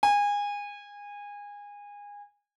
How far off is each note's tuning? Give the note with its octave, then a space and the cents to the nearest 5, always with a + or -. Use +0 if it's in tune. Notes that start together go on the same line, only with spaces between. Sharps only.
G#5 -25